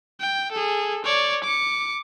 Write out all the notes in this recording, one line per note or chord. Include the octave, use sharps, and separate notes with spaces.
G5
G#4 A4
C#5 D5
D6 C#7